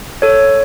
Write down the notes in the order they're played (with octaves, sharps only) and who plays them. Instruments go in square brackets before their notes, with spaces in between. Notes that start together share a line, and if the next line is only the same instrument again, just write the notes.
[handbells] A4 C#5